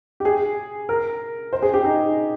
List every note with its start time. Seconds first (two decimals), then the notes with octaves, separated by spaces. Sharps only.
0.20 G4
0.25 G#4
0.89 A#4
1.53 C5
1.62 G#4
1.74 G4
1.84 D#4